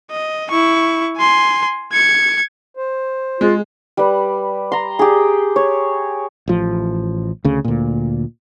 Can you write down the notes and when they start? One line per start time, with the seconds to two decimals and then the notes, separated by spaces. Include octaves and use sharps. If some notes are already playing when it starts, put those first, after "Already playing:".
0.11 D#5
0.50 E4 C#6
1.17 G#5 C6
1.93 G#6 C#7
2.77 C5
3.41 G#3 F4 G#4
3.97 G3 B4
4.72 A#5 C6
4.99 G4 G#4
5.56 C#5
6.48 A1 F3
7.45 D2 C#3
7.64 D2 A#2